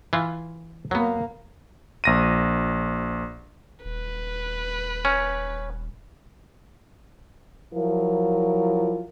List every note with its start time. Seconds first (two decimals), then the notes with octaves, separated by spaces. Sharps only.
0.13 E3 F4
0.91 F#3 A#3 B3
2.04 A#1 A#6 D#7
3.85 D#1 B4
5.05 C#4
7.74 F3 F#3 E4 F4 A#4